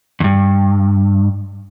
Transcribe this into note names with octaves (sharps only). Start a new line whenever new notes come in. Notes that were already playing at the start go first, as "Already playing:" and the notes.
E2 G2